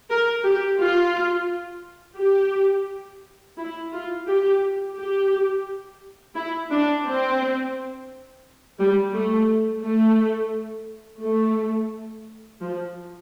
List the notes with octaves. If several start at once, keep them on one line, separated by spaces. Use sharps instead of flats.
A#4
G4
F4
G4
E4
F4
G4
G4
E4
D4
C4
G3
A3
A3
A3
F3